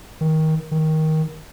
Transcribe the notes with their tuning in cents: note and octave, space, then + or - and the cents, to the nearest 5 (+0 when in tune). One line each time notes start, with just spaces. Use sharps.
D#3 +20
D#3 +15